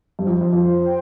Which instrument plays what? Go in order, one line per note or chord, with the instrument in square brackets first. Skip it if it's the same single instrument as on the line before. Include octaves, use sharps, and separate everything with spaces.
[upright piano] G2 [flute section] C5
[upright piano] F2
F2
[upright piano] F2 [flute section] C5
[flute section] G5